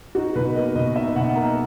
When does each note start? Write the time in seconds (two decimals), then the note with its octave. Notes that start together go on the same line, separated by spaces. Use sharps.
0.15 D#4 F#4
0.35 B2 B4
0.55 A#3 D#5
0.76 B2 D#5
0.95 D#4 E5
1.16 B2 F#5
1.36 A#3 A#5